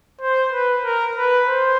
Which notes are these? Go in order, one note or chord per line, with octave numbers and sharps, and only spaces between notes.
C5
B4
A#4
B4
C5